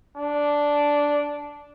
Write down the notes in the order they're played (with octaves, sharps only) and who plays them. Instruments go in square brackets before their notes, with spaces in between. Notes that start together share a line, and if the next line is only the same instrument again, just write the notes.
[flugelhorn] D4